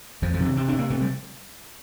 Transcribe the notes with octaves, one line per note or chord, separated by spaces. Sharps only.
F2 F3
F3
C3
E3
C3 C4
D4
C3
A#3
C3 A3
G3